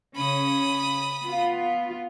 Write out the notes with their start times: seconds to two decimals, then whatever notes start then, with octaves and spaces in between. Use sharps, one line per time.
0.16 C#3 C#4 B5 D#6
1.22 B3 F4